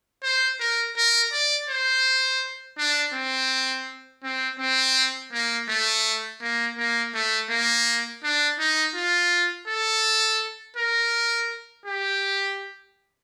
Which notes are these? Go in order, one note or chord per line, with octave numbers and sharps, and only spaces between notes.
C5
A#4
A#4
D5
C5
D4
C4
C4
C4
A#3
A3
A#3
A#3
A3
A#3
D4
D#4
F4
A4
A#4
G4